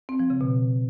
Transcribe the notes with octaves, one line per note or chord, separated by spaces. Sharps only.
C4
F3
C#3
B2